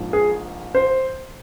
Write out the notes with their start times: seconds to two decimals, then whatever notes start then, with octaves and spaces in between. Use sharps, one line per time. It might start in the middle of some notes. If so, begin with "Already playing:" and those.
Already playing: A#1 G#2 F3
0.13 G#4
0.75 C5